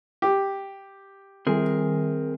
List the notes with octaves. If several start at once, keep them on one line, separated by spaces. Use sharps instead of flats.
G4
D#3 G3 C4 G#4 A#4